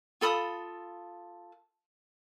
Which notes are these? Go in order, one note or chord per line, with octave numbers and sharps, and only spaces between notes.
F4 A4 B5 D#6